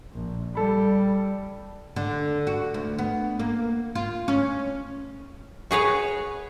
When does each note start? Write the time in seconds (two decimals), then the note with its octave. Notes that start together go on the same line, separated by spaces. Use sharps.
0.13 A#1
0.55 G3 A4 B5
1.96 D3
2.47 F#4
2.74 D2
2.99 B3
3.39 A#3
3.95 F4
4.28 C#4
5.71 F#4 G#4 B4 C#5